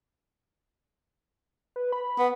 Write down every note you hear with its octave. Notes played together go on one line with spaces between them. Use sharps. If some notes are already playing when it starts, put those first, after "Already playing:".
B4
B5
B3